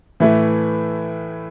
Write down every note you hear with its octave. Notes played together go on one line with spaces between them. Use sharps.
A2 E3 A3 E4 B4